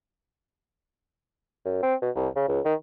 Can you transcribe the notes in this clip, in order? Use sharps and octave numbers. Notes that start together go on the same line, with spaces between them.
F#2
C4
B2
C2
C#3
C#2
D#3